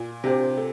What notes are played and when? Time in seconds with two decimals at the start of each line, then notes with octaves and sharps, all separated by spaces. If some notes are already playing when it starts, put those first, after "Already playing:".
Already playing: A#2
0.23 C3 D4 G4 C5
0.57 A4